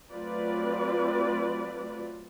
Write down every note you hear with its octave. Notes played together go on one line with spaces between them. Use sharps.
F#3 A3 C4 F4 B4 D5